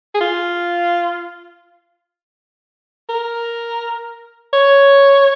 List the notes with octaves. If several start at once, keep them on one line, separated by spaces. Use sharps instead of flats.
G#4
F4
A#4
C#5